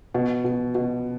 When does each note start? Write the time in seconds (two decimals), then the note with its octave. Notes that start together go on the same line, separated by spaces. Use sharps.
0.14 B2
0.44 B2
0.75 B2